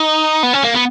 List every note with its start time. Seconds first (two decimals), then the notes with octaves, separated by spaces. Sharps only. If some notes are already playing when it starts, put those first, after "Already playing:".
Already playing: D#4
0.43 B3
0.53 C#4
0.63 A#3
0.74 B3